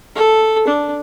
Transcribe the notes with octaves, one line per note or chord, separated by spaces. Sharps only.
A4
D4